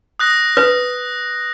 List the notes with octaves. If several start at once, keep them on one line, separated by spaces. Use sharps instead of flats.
D#6 F#6 A#6
B4 D#6